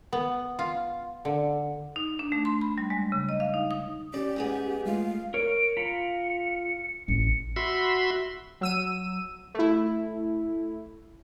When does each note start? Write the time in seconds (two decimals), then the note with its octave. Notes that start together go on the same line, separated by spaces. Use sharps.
0.13 B3
0.59 F4
1.25 D3
1.96 D#4
2.19 D4
2.32 A3
2.45 C6
2.61 B5
2.78 G3
2.90 G#3
3.12 C#3
3.29 D#5
3.40 F5
3.54 D#4
3.71 D#6
4.14 C#4 G4 D5
4.36 G#2 B3 G#4
4.86 G#3 A3 F4 F5
5.34 A#4 C#5 D7
5.77 F4 A#5 B5 C#7
7.08 A1 C#7
7.56 F#4 E5 B5 C6
8.61 F#3 E6 D#7
9.54 A3 E4